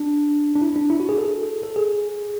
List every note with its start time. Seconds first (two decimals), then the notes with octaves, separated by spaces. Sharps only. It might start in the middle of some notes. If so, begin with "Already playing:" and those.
Already playing: D4
0.55 D4
0.61 E4
0.76 D4
0.90 E4
1.00 F#4
1.09 G#4
1.18 A4
1.63 A4
1.76 G#4